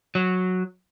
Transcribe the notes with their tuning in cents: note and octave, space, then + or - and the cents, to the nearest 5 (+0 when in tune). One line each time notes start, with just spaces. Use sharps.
F#3 -10